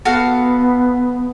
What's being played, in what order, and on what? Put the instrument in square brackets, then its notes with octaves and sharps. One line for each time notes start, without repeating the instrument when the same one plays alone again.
[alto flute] B3 [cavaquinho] F#4 A4 F5